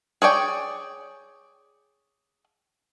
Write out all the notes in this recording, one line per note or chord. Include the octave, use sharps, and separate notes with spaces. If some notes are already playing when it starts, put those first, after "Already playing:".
G#4 C#5 D5 G5